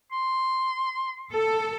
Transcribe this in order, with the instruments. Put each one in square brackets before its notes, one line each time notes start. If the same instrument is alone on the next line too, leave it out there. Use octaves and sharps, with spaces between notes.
[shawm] C6
[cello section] A4